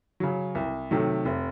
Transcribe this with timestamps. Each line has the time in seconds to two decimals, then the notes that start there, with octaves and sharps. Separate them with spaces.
0.20 C#3 F#3
0.55 C2
0.91 C3 D#3 F#3 A3
1.25 F1